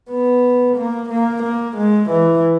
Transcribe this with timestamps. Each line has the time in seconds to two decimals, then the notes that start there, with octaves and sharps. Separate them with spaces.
0.11 B3
0.77 A#3
1.10 A#3
1.44 A#3
1.77 G#3
2.10 E3